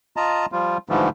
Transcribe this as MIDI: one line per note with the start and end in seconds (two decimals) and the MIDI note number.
0.17 0.46 65
0.17 0.46 75
0.17 0.46 81
0.17 0.46 82
0.52 0.78 53
0.52 0.78 55
0.52 0.78 65
0.89 1.09 44
0.89 1.09 50
0.89 1.09 52
0.89 1.09 53
0.89 1.09 55
0.89 1.09 57